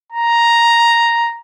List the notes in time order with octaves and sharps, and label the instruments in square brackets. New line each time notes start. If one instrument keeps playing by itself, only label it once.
[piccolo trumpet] A#5